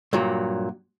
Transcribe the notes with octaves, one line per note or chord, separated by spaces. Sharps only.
G2 A#2 F#3